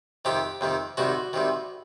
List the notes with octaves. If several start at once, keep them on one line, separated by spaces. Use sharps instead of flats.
F2 C3 D#3 G4
F2 C3 D#3
C2 C3 D#3 F#4
C2 C3 D#3